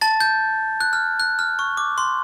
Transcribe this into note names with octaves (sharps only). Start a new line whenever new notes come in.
A5 A6
G6
F#6
F6
F#6
F6
C#6
D6
C6